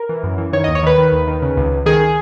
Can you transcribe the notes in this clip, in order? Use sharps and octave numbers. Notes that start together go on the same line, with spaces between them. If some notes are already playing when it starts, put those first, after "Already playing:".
Already playing: A#4
E3
F#2
E3
D#3 C#5
D#2 D#5
C#5
D#3 B4
D#3
D#2
D#3
C#3
C#2
C#2
D#3 G#4